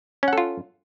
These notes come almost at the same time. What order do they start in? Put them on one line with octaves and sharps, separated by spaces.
C#4 F#5 A4 F4